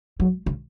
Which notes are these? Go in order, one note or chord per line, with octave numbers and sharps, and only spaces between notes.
F#3
C#3